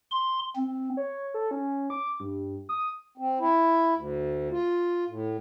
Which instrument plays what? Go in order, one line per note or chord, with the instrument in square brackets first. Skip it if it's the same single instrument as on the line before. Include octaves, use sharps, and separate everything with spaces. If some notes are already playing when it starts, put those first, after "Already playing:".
[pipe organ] C6
C4
[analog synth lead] C#5
A4
C#4
D6
G2
D#6
[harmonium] C4
E4
D2
F4
A2